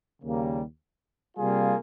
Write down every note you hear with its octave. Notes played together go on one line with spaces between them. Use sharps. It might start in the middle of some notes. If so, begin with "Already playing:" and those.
D#2 C#3 G3 A#3
C3 G3 A#3 F4 G#4